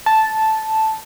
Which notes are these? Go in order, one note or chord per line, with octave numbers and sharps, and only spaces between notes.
A5